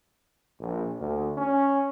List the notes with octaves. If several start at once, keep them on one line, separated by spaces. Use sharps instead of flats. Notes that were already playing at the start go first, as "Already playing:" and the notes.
A#1
D2
C#4